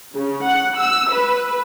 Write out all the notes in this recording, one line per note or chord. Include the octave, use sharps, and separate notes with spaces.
C#3
F#5
E6
B4